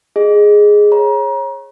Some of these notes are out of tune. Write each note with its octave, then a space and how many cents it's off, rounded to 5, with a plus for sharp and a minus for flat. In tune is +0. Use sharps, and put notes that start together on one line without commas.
G#4 +0 D#5 -10
C#5 -30 A#5 +35